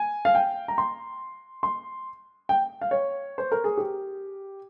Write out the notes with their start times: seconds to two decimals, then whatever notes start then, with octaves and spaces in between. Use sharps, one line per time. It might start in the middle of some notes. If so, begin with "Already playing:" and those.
Already playing: G#5
0.25 F5
0.35 G5
0.68 A#5
0.78 C6
1.63 C6
2.49 G5
2.81 F5
2.91 C#5
3.38 C5
3.52 A#4
3.64 G#4
3.78 G4